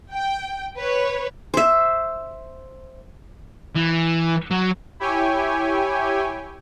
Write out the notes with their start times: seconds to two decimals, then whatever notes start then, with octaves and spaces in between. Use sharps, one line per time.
0.13 G5
0.77 B4 C#5
1.54 C5 E5
3.75 E3
4.50 F#3
5.00 E4 G4 C#5 G5 G#5